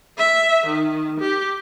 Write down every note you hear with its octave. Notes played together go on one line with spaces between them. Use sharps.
E5
D#3
G4